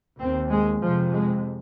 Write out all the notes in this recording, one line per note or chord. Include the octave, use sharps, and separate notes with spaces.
D#2 C4
G#3
F2 C3 F3
G#3